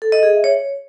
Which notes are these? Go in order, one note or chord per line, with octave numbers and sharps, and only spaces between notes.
A4
D#5
G#4
E5
C#5